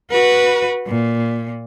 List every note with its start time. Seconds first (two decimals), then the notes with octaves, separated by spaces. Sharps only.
0.11 F#4 B4
0.87 A#2